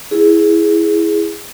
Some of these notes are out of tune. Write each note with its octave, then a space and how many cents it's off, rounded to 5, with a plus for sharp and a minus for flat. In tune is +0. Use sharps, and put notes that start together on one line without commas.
E4 +0 G#4 +0